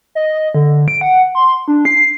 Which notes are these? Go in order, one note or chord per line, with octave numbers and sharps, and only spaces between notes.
D#5
D3
D7
F#5
C6
D4
C7